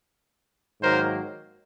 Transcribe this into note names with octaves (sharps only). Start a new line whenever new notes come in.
G#2 D#3 F#3 A#3 A#4 C5